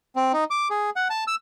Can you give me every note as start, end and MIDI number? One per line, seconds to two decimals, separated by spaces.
0.16 0.32 60
0.33 0.44 63
0.51 0.68 86
0.70 0.90 68
0.96 1.08 78
1.10 1.24 81
1.27 1.35 88